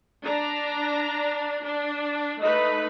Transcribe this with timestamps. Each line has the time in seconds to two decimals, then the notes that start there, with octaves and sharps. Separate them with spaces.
0.22 D4 A#5
1.63 D4
2.40 A3 D#4 B4 D#5